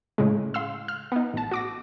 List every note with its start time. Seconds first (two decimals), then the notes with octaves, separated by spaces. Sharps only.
0.18 A2 C#3 G#3
0.54 F5 C6 E6
0.88 F6
1.12 B3 D#4
1.34 A1 A5
1.51 F#4 D6 A#6